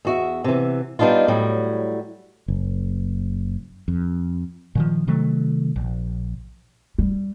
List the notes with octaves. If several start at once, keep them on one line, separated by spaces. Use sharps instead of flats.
E2 F#4 E5
C3 E3
G3 B3 D4 D#4 F4
A2 F#3 G3
F#1
F2
A#2 D#3 F3
C3 D#3 F#3 A3
A#1
G3